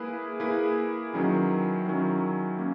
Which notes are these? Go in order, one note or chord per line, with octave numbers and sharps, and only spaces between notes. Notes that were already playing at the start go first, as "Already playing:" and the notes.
Already playing: A#3 E4 G#4 B4
A#3 E4 G#4 B4
D#3 F#3 C#4 E4
D#3 F#3 C#4 E4
A#3 C#4